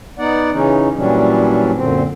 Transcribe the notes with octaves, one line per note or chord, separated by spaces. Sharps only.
B3 D#4 D5 F#5
C#3 E3 C#4 D#4
A#2 E3 F#3 G3 C#4 D4
F#2 A#2 D3 C4